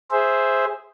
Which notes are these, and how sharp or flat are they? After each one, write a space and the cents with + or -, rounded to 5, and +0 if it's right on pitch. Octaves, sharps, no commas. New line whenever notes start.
G#4 +0 C5 +0 E5 +0